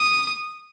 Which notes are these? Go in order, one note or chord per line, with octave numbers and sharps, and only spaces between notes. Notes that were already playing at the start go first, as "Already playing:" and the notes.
Already playing: D#6